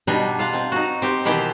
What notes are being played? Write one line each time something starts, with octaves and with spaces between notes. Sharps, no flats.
B2 G3 D4 D#4
F4 F5 F#5
C4
D#4 F#4
C4 G4
B2 D#3 E3 G4